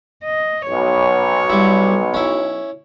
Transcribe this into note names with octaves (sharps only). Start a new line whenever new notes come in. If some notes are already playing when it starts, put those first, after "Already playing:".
D#5
B1 C#5
G3 E4
C#4 E4